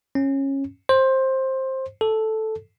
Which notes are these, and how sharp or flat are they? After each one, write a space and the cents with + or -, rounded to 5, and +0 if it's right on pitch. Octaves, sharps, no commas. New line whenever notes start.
C#4 -20
C5 +15
A4 -5